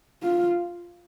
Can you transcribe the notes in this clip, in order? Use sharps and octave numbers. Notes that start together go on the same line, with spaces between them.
F4